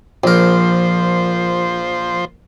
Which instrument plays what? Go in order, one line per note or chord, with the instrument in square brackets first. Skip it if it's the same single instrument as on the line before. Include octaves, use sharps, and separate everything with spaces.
[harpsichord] A#1 A#4 [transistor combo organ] F3 C5